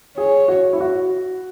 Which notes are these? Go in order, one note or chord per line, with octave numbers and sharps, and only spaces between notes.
G#4 C#5
F#4
E4
F#4